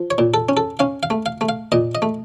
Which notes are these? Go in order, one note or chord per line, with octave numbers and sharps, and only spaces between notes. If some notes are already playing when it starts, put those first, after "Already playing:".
Already playing: F3
C#5
A#2
A4
C#4
A4
C#4 F5
F5
A3
F5
A3
F5
A#2 D#5
D#5
A3